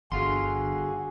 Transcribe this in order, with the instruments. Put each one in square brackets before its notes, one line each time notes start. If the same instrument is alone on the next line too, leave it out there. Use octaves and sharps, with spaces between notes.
[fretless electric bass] G1 [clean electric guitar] D3 F5 C6 [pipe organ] F#4 G#4